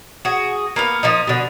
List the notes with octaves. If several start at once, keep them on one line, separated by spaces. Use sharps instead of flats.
F#4 G#4
A#3 B3 F5
F3 A#3 D#4
B2 D3